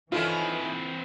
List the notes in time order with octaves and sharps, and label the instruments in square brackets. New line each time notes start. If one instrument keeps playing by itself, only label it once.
[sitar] D#3 C#4 E4 [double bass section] E3 [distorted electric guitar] C4 B4 [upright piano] F4 A4